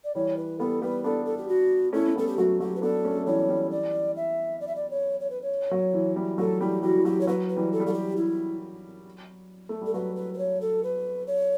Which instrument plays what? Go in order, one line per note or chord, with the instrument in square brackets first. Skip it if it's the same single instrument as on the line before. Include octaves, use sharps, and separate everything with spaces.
[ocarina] D5
[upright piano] E3 G3 [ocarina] C#5
[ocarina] B4
[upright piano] G3 B3 [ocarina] A4
[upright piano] G3 B3 [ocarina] B4
[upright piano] B3 D4 [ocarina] A4
[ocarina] A4
G4
F#4
[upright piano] A3 C#4 [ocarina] E4
[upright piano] C#4
[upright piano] G3 B3 [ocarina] A4
[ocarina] G4
[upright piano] F#3 A3 [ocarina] F#4
[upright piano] F#3 [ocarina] G4
[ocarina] B4
[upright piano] B3 D4 [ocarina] A4
[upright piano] A3 C#4
A3
[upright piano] E3 G3 [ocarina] C#5
[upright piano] E3 G3
[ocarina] D5
E5
D5
E5
D5
C#5
C#5
B4
C#5
[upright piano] F#3
E3
E3 G3
[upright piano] F#3 A3 [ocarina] A4
[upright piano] E3 G3 [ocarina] G4
[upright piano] E3 G3 [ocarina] F#4
[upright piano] E3
[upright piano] F#3 [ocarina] G4
[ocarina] C#5
[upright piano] F#3 [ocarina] B4
[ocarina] B4
[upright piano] E3 G3
[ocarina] A4
[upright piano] G3
[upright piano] F#3 [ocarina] A4
[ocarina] G4
E4
[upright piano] A3
[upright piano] G3 [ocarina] A4
[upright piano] F#3 [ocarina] B4
[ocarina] B4
B4
C#5
A4
B4
C#5